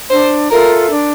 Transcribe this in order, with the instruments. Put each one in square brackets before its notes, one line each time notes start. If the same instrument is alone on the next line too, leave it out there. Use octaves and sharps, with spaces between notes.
[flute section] D4 [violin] C5
[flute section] F4 A4 E5 [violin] A#4
[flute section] D4